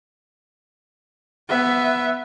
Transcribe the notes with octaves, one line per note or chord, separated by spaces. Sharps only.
B3 E5